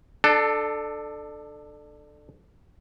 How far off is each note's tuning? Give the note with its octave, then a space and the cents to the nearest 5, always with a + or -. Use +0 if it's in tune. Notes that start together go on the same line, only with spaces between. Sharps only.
D4 +25 A4 +0